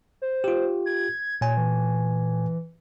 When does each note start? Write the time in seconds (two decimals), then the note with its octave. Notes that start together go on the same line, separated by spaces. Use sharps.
0.22 C5
0.44 F4 G4
0.86 G#6
1.41 A#2 C#5 G#5
1.57 E3